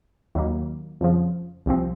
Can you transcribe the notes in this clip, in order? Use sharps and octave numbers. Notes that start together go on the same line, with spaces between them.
D#2 D#3 F#3 A#3
F2 C#3 F3
C2 C3 F3 C4